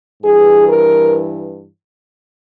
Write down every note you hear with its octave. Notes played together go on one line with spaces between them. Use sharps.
G2 E3 G#4
A#4